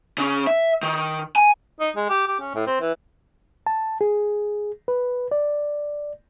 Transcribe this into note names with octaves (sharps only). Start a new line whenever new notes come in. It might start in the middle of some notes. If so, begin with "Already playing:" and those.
C#3 C#4
E5
D#3
G#5
D#4
G#3
G4
G4
C#4
A2
C4
E3
A5
G#4
B4
D5